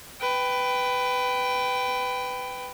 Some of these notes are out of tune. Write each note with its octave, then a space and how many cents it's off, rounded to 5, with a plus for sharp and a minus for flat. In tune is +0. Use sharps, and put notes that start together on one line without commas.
B4 +15 G5 +0